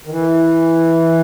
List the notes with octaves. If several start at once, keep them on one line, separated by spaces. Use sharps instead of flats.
D#3
E3